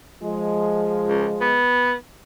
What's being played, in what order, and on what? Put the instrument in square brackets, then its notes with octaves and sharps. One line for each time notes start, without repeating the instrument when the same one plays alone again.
[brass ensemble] F3 G#3
[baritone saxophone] C#2
B3